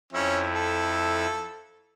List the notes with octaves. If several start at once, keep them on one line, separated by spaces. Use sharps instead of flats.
F2 C#4 E4
A4